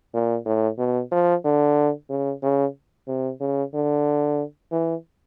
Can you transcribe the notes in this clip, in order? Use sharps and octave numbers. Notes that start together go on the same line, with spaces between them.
A#2
A2
B2
F3
D3
C#3
C#3
C3
C#3
D3
E3